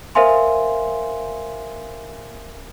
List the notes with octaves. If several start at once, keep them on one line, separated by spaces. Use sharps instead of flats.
A#4 C5 E5 F5 G#5 C6